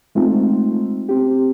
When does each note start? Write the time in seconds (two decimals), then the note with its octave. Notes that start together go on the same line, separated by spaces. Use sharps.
0.15 G#3 A3 C4 D#4 F4
1.09 C4 G4